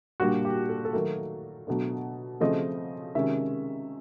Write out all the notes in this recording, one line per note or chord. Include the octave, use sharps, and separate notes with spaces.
A#2 G3 A#3 D4 F#4
G4
A4
A4
D#3 F#3 A3 A#4
B2 F#3 A3 D4
C#3 F3 A3 C4 D#5
C3 D#3 G#3 C#4 E5